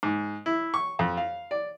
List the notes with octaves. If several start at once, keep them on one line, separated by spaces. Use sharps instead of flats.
G#2
E4
C#6
F2
F5
D5